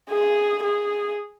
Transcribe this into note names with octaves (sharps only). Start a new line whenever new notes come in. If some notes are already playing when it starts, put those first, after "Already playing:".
G#4
G#4